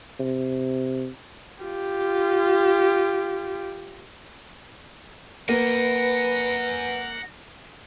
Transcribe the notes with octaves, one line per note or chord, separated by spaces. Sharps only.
C3
F4 G4
A#3 B4 F#5 G#5 A#6